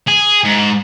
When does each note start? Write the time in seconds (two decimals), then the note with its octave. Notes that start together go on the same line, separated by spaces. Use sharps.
0.08 G#4
0.45 G#2